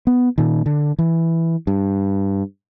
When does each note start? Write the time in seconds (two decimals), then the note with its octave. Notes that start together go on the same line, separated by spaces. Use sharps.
0.07 B3
0.38 A#2 D#3
0.66 D3
0.99 E3
1.67 G2